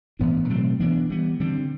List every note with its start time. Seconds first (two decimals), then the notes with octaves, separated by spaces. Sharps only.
0.19 A2 E3 B3 D4
0.49 B2 F#3 A3 C4
0.80 E3 B3 D4
1.10 E3 G3 B3
1.40 D3 G3 C4